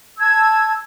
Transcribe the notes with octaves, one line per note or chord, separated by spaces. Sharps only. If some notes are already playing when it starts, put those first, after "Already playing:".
A5 E6 G#6